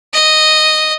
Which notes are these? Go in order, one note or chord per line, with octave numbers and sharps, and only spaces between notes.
D#5